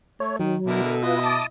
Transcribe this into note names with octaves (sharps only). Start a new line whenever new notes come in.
A3 C#5
D#3 F#3
B2 D3 E4 A#4
A4
E4 F4 B4 D#5
A5 D6 D#6